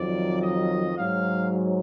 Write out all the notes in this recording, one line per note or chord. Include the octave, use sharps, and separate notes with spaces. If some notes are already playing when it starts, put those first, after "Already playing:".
Already playing: F2 D#3 F#3 D5
D#5
G#2 F#3 F5